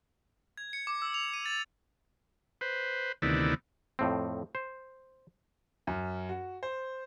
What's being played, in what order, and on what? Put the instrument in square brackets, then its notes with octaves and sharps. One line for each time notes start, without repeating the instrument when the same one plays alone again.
[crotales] G#6
C#7
D6
E6
F7
D#7
A6
[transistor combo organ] B4 C5
D2 C3 D#3 B3 E4 D5
[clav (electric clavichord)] F2 A2 C4
C5
[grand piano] F#2
F#4
C5